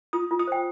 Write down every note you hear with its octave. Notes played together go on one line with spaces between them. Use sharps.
F4 D#6
F4
D#6
C5 G5